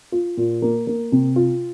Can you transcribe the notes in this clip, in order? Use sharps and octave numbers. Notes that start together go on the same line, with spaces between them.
F4
A#2
A#3
A#3
C3
F4